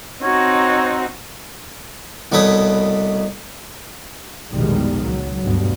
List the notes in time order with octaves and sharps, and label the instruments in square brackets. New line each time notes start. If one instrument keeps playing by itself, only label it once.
[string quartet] C4 D#4 F#4 [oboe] C#5
[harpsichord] C2 B2 A3 B4 C#5 D#6
[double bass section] A#1 E2 B2 D#3 G3 G#3
C#2 F#3
D2 G2 B2